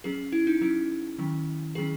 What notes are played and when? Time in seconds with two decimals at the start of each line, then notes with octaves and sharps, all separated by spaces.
0.04 F#3 C#4 G#4
0.32 E4
0.47 D#4
0.61 F#3 C#4 E4
1.19 D#3 F#3 C#4
1.75 D#3 F#3 C#4 G#4